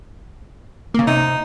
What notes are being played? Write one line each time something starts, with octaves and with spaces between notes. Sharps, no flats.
C#3 A#3
C3 D#4